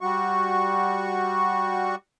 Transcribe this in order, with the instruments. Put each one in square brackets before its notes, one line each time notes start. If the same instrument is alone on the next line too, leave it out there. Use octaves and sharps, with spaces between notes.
[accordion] G3 F#4 C#6